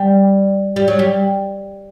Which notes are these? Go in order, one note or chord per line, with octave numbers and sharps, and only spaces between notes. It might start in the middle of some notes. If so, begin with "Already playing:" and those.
Already playing: G3
G3
F#3
G3